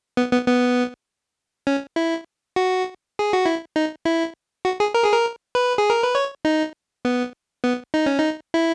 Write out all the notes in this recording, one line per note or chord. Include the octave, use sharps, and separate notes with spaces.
B3
B3
B3
C#4
E4
F#4
G#4
F#4
E4
D#4
E4
F#4
G#4
A#4
G#4
A#4
B4
G#4
A#4
B4
C#5
D#4
B3
B3
D#4
C#4
D#4
E4